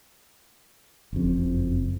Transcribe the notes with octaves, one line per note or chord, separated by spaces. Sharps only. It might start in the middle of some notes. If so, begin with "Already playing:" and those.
F#1 F2